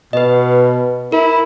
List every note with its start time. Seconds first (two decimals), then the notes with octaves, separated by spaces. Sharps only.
0.13 B2 B4 D#5
1.12 E4 A#4